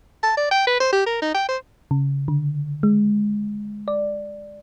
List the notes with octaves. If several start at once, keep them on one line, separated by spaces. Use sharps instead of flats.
A5
D5
G5
B4
C5
G4
A#4
D#4
G5
C5
C#3
D3
G#3
D5